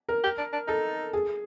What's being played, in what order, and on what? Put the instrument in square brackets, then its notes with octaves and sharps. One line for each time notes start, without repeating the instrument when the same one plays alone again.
[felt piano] A#4
[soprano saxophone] G4
D4
D4
[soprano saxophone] D#4 [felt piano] A4
[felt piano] G#4